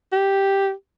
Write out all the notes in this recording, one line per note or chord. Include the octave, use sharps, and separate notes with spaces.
G4